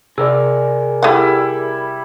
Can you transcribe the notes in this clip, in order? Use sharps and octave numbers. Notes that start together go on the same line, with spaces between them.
C3 G#4 A#4 D5
G3 A3 E4 F#5